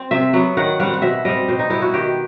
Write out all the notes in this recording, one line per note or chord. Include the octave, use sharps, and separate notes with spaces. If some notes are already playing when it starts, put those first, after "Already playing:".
Already playing: C4
C3 E5
F#3 B3
D#3 F#5
G3 C4 F#5
F#5
B2 E5
G3 C4 D#5
B2 C5
D#4
G3 B3 E4
F#4
D#3 G4